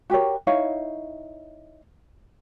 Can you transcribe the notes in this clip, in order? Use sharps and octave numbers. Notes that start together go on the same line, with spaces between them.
F#4 G4 A#4 C#5
D#4 E4 C#5 F5